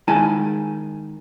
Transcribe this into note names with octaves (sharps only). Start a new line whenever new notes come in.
D#3 G#3 E4 G#5 A5